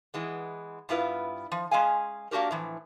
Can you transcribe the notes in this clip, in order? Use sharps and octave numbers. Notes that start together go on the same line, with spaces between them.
E3 G#3 B3
G2 B3 E4 F4 B4
F3
G#3 C#4 G#4 F5 G#5
A#3 D4 F#4 G4 A#4
A2 E3 F3